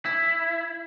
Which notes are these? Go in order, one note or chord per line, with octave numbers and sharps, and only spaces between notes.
E4